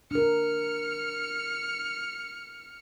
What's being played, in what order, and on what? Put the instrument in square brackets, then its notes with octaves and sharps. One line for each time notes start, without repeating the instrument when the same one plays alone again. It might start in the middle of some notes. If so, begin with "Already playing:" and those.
[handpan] D4 A#4 [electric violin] F6 C#7